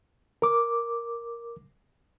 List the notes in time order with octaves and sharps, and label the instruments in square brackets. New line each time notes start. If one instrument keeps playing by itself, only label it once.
[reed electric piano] A#4 D6